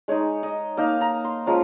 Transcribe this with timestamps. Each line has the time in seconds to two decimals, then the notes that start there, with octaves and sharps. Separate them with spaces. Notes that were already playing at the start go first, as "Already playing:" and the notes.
0.08 G#3 D#4 C#5
0.43 D#5
0.77 A#3 D#4 F5
1.01 A#5
1.24 C6
1.46 F3 G#3 C#4 F4 A#5